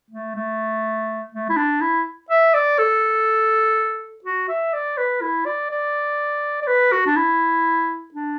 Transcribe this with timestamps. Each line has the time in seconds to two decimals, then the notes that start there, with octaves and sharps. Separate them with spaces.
0.11 A3
0.36 A3
1.32 A3
1.49 E4
1.57 D4
1.81 E4
2.30 E5
2.54 D5
2.79 A4
4.24 F#4
4.49 E5
4.73 D5
4.98 B4
5.21 E4
5.46 D5
5.71 D5
6.62 D5
6.67 B4
6.92 F#4
7.06 D4
7.17 E4
8.14 D4